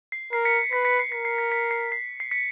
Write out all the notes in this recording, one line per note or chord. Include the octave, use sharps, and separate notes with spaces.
C7
A#4 C7
B6 C#7
B4 B6
B6 C#7
C7
A#4 B6
C7
B6
B6 C#7
C7
C7
C7
B6 C#7